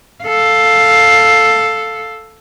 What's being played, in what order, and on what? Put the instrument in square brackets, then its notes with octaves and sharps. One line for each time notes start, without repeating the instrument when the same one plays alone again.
[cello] A4 F5